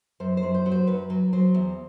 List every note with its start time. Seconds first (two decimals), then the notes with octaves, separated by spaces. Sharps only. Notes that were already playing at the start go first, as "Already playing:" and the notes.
0.20 F#2 C5
0.37 C5
0.43 F#2
0.54 C5
0.66 F#3
0.71 C5
0.87 F#2 B4
1.10 F#3
1.33 F#3 C5
1.55 E2